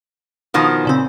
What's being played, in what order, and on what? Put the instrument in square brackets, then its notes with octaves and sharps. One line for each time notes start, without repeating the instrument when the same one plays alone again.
[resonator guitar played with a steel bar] B2 D#3 F3
[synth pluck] A#2 C#3 C4